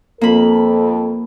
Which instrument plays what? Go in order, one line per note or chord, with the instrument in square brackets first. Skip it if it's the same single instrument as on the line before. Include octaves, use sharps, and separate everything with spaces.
[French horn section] F2 A4 [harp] A#3 B5